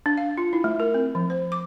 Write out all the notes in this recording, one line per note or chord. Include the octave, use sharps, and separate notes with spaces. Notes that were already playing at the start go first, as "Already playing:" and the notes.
D4
F5
F4
E4
A3
A#4
C4
F3
C5
D6